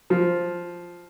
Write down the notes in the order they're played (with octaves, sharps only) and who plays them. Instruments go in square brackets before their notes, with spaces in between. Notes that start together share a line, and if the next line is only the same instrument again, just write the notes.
[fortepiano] F3